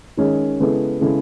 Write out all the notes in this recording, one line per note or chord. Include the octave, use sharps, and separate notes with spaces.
D#3 G#3 C#4
C#3 G#3 B3 E4 A4
C#3 G#3 B3 E4 A4